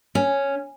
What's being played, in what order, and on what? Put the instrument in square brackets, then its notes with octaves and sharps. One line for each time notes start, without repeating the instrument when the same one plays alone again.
[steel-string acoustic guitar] C#4